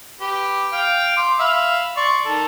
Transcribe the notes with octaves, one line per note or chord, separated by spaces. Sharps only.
G4 B4
F5 G5
C6 D6
E5 F5 B5
D5 C6 C#6
D#3 A4